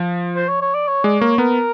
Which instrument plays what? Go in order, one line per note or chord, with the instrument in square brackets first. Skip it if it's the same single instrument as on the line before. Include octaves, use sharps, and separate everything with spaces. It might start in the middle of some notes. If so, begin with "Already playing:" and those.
Already playing: [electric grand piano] F3
[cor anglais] C5
C#5
C#5
D5
C#5
[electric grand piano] G#3 [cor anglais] D5
[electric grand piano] A#3 [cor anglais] C#5
[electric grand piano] B3 [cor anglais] A#4